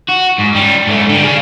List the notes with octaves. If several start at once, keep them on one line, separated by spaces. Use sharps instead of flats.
F#4
G#2
G3 C#4
G#2 A3
D3 G3
G#4 F5